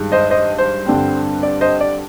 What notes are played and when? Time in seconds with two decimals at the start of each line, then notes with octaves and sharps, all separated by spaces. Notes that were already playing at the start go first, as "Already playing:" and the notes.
Already playing: G2 D#3 G#3
0.12 C5 D#5
0.30 C5 D#5
0.58 C5
0.86 G2 D3 G3 C4
1.43 D5
1.61 C5 D#5
1.81 D5